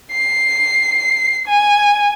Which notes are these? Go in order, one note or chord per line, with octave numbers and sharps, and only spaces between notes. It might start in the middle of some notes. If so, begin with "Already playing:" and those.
C7
G#5